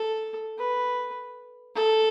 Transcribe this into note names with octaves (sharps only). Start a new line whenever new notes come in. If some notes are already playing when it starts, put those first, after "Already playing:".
Already playing: A4
B4
A4